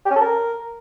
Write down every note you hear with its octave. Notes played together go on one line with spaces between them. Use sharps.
G4
C#4
A4
A#4